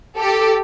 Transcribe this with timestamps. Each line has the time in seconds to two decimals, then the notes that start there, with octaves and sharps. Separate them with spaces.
0.21 G4 A4